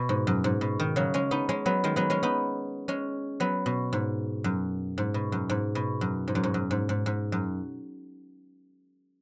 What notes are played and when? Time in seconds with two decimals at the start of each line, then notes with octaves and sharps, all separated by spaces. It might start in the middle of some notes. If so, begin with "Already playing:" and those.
Already playing: B2
0.09 G#2
0.27 F#2
0.44 G#2
0.61 B2
0.80 D#3
0.96 C#3 F#3
1.14 G#3 C#4
1.31 B3 D#4
1.49 G#3 C#4
1.66 F#3 B3
1.84 D#3 G#3
1.96 F#3 B3
2.10 G#3 C#4
2.23 B3 D#4
2.88 G#3 C#4
3.40 F#3 B3
3.66 B2
3.93 G#2
4.44 F#2
4.98 G#2
5.14 B2
5.32 F#2
5.50 G#2
5.75 B2
6.01 F#2
6.28 G#2
6.35 F#2
6.43 G#2
6.54 F#2
6.71 G#2
6.89 G#2
7.06 G#2
7.32 F#2